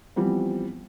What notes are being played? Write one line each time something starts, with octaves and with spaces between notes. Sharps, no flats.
E3 F3 G3 B3 C4